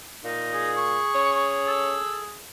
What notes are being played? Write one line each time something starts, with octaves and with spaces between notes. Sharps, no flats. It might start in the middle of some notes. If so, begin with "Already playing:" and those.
A#2 D#4
G#4
C#6
C#4
A4